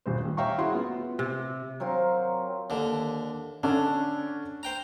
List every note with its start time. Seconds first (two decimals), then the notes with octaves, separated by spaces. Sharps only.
0.06 D#1 G2 C5
0.25 G3
0.37 C#5 E5 F5 G5 A#5 C#6
0.58 E4 F#4 G#4 F#5 C6
0.75 B3 F4
1.19 C3
1.80 F#3 C4 F4 A#4
2.70 D#2 D3
3.63 D3 C#4 D4 A4
4.63 C5 G5 A#5